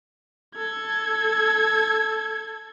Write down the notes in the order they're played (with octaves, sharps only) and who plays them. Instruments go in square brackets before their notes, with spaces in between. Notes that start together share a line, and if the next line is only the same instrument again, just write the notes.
[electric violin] A4 G#6